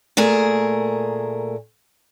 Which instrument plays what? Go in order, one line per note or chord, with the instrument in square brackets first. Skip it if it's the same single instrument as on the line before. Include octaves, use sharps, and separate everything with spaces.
[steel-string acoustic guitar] A#2 A3 G#4 A#4